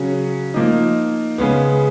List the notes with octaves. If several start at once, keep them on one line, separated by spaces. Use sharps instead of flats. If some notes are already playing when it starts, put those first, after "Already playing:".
Already playing: C#3 F#3 C#4
F3 A#3 D#4
C#3 G#3 B3